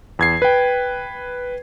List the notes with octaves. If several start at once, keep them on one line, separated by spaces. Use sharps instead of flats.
E2 G#6 C7
B4 G5